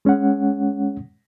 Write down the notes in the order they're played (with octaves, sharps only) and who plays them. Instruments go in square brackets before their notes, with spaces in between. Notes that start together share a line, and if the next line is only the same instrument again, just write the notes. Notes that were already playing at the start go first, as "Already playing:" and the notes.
[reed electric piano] G#3 C#4 C#5 F#5